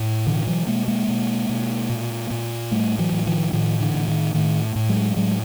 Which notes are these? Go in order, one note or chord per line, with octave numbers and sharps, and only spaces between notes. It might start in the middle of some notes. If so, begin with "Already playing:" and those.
Already playing: A2
B2 D3 E3
E3 F#3
B2 G#3 A#3
G#3 A#3
B2
B2
A#2
A#2
A2 G3 A3
E3 F#3
A2
D#3 F3
A2 D#3 F3
D3 E3
A2
D#3
A2 D#3
A2
F#3 G#3
A2 F#3 G#3